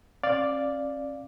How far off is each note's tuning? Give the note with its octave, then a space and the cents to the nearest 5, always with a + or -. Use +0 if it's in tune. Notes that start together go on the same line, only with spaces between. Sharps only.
C#4 -40 D5 +0 F5 +0